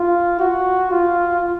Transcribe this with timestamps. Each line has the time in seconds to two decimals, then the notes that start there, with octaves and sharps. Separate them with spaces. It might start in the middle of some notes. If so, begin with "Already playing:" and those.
Already playing: F4
0.39 F#4
0.91 F4